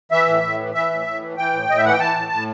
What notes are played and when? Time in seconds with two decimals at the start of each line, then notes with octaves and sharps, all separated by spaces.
0.12 E3 E5
0.27 A2
0.43 A2
0.59 E3
0.74 E3 E5
0.90 A2
1.06 A2
1.21 E3
1.37 E3 G5
1.53 A2
1.69 A2 D#5
1.77 E5
1.84 E3 F#5
1.93 G5
2.00 E3 A5
2.16 A2
2.32 A2